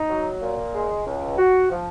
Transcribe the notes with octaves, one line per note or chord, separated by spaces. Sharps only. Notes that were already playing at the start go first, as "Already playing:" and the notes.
Already playing: D#4
F#3
A#2
G#3
C#2
F#4
F3